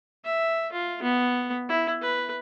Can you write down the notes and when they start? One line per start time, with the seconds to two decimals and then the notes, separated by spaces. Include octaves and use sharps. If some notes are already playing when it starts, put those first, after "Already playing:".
0.25 E5
0.72 F4
1.02 B3
1.69 E4
2.01 B4